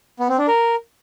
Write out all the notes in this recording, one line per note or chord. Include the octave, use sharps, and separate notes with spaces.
B3
C4
D4
A#4